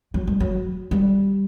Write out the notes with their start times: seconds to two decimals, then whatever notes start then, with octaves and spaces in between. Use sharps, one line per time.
0.14 F#3
0.27 G3
0.40 F#3
0.91 G3